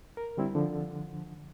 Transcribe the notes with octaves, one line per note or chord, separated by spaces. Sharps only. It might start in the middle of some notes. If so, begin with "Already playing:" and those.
A#4
D3 G3 C4 E4
D3 F3